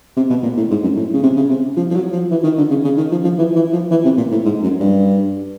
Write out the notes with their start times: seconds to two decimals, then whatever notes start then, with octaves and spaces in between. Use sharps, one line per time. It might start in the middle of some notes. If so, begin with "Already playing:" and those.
0.17 C3
0.30 B2
0.43 A#2
0.57 A2
0.71 G#2
0.83 F#2
0.96 A2
1.14 C#3
1.23 C3
1.36 C#3
1.50 C3
1.77 F3
1.91 F3
1.95 F#3
2.13 F3
2.31 E3
2.44 D#3
2.58 D3
2.70 C#3
2.85 C#3
2.97 D#3
3.11 F3
3.24 F3
3.38 E3
3.56 E3
3.73 F3
3.91 E3
4.05 C3
4.17 A#2
4.31 A2
4.45 G#2
4.63 F#2
4.80 G2